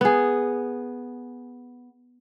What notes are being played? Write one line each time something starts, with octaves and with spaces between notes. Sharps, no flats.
B3 G#4